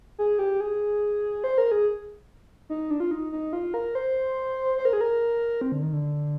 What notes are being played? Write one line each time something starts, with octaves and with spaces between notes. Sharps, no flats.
G#4
G4
G#4
C5
A#4
G#4
D#4
D4
F4
D#4
D#4
F4
A#4
C5
C5
A#4
G#4
A#4
C4
D3
D#3
D3